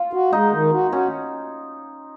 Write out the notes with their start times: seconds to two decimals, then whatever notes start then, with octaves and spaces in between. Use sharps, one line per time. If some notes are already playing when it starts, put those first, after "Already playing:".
Already playing: F4
0.13 F#4
0.32 G#3 D#4
0.52 D#3
0.72 F#4
0.91 C#4 F#4